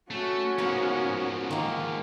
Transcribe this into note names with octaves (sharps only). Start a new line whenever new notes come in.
A3 C#4 F#4
G#2 F3 A#3 B3
D#3 A#3